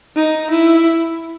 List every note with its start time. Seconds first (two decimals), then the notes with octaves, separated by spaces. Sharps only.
0.16 D#4
0.51 E4